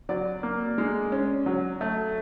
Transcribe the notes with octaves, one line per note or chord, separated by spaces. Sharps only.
F#3 D5
A#3
G#3
C#4
F#3
A3